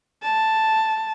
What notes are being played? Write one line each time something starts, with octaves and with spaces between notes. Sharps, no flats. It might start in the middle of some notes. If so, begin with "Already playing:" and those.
A5